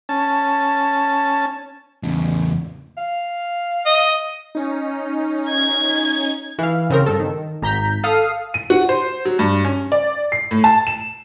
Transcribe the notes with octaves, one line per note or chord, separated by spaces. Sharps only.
C#4 A5
E2 C#3
F5
D#5
C#4 D#4
G#6
E3 F5
C#3 C4 A#4
G2 A4
D#3
G#1 A#5 G6 B6
A4 F5 D#6 F6 C7
D#7
F#4
C5
F#3
G2
C#4
D5
C7
A2
A5
E7